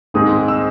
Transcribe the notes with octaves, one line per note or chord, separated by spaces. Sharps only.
G#2 D#3 G#3 C4 D#4 D#6
E6